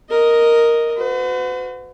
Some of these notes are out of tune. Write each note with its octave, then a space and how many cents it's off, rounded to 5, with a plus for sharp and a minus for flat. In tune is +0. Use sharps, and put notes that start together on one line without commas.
A#4 +0 D#5 +0
F#4 -25 B4 +45